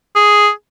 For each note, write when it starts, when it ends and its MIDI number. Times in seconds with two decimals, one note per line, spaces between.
0.16 0.50 68